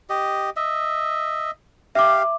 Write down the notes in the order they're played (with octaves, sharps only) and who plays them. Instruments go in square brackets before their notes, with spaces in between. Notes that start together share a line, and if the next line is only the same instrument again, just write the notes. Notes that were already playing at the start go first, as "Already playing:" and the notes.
[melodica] G4 D#5
D#5 E5
[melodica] G4 F5 [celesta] E5 D6